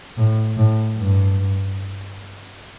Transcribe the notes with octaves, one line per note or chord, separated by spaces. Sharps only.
A2
A2
G2